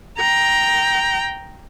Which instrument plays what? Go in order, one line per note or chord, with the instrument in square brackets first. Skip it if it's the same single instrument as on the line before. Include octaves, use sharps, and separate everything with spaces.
[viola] G5 A#5